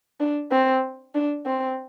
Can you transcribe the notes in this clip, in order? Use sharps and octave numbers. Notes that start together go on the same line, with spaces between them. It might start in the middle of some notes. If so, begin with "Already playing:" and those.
D4
C4
D4
C4